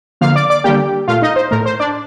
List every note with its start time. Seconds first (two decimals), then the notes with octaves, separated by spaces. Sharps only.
0.21 D3 F3 A#3 F5 F6
0.35 D5 D6
0.50 D5 D6
0.64 D3 G3 A#3 G4 G5
1.08 A#2 A3 F4 F5
1.22 D#4 D#5
1.36 C5
1.51 A2 A3 A#4
1.66 C5
1.80 D4 D5